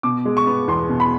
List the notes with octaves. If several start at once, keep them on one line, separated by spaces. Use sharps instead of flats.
B2 D6
G#3
C#6
B3
E2 C6
B2
B5